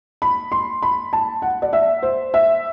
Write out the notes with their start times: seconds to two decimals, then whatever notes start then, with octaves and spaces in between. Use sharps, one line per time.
0.22 B5
0.52 C6
0.82 B5
1.13 A5
1.42 F#5
1.62 D5
1.73 E5
2.03 C5
2.34 E5